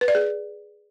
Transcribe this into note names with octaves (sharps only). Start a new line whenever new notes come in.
B4
D5
G#4